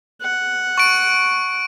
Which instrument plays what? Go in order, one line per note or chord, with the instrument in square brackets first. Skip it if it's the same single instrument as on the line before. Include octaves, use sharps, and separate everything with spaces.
[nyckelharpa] F#5
[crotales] C#6 D7